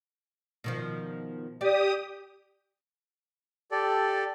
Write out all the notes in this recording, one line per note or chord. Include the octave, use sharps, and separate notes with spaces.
B2 D#3 F3
G4 D5 D#6
G4 A4 D5